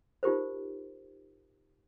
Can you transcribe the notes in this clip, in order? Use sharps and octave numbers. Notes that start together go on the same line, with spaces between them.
D#4 F4 G4 A#4 C5